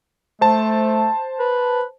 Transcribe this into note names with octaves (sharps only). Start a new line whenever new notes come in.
A3 C5 A5
B4